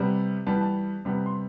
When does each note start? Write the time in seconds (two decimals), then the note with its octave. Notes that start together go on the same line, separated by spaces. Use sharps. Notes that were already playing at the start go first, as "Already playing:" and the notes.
Already playing: C3 G3 B3
0.46 E3 G3 B3 A5
0.61 A5
1.05 C3 G3 B3
1.26 C6